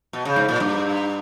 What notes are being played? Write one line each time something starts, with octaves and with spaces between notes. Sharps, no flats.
B2
C#3
G#2
A#2
G2